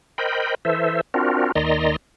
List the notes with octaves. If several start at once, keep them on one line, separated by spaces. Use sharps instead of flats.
A#4 C5 D#5 G5 B5
E3 A4 C5 E5
C4 D4 F4 F#4 A#4
D#2 D#3 D5 D#5 A#5 C6